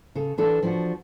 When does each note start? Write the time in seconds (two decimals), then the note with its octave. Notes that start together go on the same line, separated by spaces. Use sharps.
0.15 C#3 A4
0.38 E3 D4 A4
0.63 F3 D4 F#4